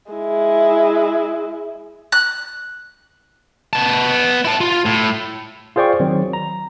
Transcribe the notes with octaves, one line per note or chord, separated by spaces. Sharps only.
G#3 E4
F#6
B3 A5
E4 A5
F4
A2
F4 G#4 C5 D5 G5 C#6
D#3 F#3 C4
A#5